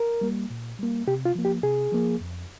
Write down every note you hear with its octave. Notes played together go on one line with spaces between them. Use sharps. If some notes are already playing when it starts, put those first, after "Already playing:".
Already playing: A#4
G3 A#3
A#2
G3 A#3
C3 G4
F4
F3 A#3
G4
C3 G#4
F3 A#3
F2